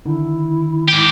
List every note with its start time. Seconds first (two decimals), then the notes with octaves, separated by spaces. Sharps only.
0.05 D3 D#3 E4
0.88 G#2 G4